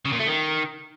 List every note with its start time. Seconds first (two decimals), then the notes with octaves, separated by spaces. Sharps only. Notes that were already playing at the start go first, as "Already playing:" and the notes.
0.05 C#3
0.12 A#2
0.19 A3
0.26 D#3